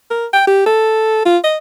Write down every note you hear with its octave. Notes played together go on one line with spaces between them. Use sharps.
A#4
G5
G4
A4
F4
D#5